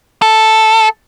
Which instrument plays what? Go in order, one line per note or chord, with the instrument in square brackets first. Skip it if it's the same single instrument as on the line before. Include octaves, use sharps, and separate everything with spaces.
[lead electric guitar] A4